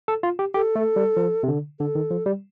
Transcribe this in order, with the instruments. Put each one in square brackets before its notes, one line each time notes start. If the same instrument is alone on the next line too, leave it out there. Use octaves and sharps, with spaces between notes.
[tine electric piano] A4
F4
G4
[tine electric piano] G4 [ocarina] A4
[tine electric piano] A3
G3
F3
C3
D3
[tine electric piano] D3 [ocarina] A4
[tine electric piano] D#3
F3
G3